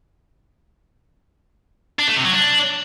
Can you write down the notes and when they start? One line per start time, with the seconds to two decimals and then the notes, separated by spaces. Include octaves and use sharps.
1.99 D4
2.08 A3
2.16 C3
2.25 F#3
2.34 D4